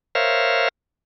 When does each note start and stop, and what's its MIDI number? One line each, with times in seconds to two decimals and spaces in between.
0.15 0.68 70
0.15 0.68 72
0.15 0.68 73
0.15 0.68 76
0.15 0.68 77